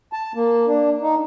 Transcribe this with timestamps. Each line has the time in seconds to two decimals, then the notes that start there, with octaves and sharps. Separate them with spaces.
0.13 A5
0.35 A#3
0.67 D4
1.01 D#4